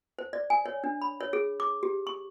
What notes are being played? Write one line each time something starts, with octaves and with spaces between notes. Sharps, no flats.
C5
D5
G#5
C#5
D4
B5
C#5
G#4
D6
G4
C#6